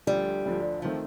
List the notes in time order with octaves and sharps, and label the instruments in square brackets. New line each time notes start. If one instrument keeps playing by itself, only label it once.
[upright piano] D2 D3 F3 [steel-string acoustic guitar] G3
[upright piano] D2 D3 F3
[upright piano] D#3 A3 C4 [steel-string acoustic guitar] F3